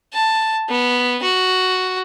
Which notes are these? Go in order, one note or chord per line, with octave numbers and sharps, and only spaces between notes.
A5
B3
F#4